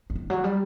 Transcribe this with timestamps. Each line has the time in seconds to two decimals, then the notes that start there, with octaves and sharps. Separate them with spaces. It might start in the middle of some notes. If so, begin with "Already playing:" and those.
0.10 F#3
0.16 D#3
0.30 F#3
0.44 G3